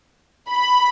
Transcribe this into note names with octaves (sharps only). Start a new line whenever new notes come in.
B5